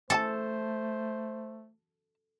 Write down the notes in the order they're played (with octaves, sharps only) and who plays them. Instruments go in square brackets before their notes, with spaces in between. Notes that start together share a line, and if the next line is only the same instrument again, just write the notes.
[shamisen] E3 G4 A5 [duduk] A3 [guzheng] A4 [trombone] C5